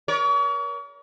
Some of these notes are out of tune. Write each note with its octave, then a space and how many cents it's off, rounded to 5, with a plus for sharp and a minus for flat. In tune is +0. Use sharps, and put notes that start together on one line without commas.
A#4 +30 C#5 +40